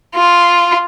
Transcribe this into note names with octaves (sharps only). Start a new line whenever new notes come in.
F4